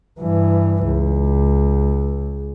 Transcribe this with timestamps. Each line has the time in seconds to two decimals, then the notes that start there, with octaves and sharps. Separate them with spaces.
0.21 G2 E3
0.86 C#2